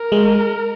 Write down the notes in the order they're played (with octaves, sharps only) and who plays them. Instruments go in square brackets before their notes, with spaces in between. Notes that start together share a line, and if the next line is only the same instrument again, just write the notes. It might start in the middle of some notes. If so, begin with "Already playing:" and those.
Already playing: [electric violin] A#4
[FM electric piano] G#3